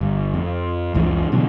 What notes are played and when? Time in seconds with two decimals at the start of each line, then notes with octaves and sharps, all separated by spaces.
0.01 G1
0.34 F2
0.95 F#1 C#2 E3 F3
1.32 B2 D3 E3 F#3